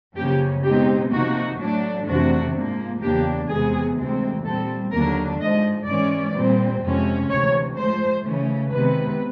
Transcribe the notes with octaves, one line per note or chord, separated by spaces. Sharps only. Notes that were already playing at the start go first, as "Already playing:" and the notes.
F#2 C#3 F3 A#3 C#4 G4
B2 G#3 C4 D#4 G4
C3 F3 A#3 D#4 F#4
A2 F#3 A3 D4
F2 C3 E3 A3 D4 F#4
G#2 F3 A#3
E2 C#3 F3 A#3 D4 G4
E2 C3 E3 G#3 B3 G#4
D2 C3 E3 G#3 C4
A#2 G3 C4 A4
D#2 D3 F#3 A#3 D4 A#4
G#2 F3 G#3 D#5
G#2 E3 G#3 C#4 D5
A#2 G3 C4
F2 C3 F3 G#3 C#4
D2 C3 E3 C#5
A2 F3 G#3 C5
C#3 E3 A3 C#4
C3 D#3 G#3 B3 B4